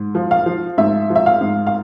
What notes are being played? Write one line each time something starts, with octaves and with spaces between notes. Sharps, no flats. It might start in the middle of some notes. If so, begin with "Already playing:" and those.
Already playing: G#2
F3
F5
F3
G#2 E5
F3
E5
F5
G#2
F5